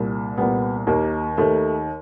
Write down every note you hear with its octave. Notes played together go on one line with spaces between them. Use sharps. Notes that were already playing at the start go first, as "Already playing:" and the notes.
Already playing: C2 A#2
C2 A#2 B3
D#2 D#3 A#3
D#2 D#3 A3